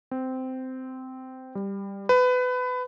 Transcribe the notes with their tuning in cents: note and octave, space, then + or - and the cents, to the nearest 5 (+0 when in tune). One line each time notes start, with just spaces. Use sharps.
C4 -15
G3 +10
B4 +25